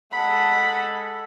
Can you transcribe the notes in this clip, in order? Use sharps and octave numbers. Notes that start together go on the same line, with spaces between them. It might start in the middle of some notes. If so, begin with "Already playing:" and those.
G#3 A4 F#5 B5